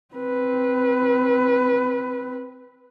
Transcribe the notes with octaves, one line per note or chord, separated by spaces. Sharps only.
C4 B4